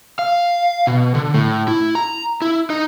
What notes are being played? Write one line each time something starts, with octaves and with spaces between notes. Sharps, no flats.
F5
B2
D3
A2
E4
A#5
E4
D#4